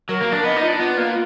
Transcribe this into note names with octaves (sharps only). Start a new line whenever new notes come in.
F#3 A#4
A#3
D4
B3 D#5
D#4 F4
D4
B3 F4
A#3